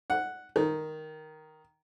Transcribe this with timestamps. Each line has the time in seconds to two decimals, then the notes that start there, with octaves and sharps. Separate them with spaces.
0.10 F#5
0.56 D#3